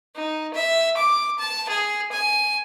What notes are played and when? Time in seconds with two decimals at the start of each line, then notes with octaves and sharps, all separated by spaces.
0.16 D#4
0.55 E5
0.97 D6
1.39 A5
1.69 G#4
2.12 G#5